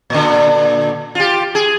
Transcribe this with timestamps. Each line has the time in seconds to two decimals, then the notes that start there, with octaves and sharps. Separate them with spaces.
0.10 A#2 D3
1.15 F4 G4
1.55 G#4